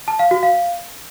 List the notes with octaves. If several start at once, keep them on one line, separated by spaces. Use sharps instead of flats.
A5
F5
F#4
F5